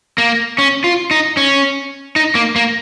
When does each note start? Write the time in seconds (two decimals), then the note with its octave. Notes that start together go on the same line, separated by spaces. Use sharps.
0.18 A#3
0.58 C#4
0.84 F4
1.11 D#4
1.37 C#4
2.16 D#4
2.35 A#3
2.56 A#3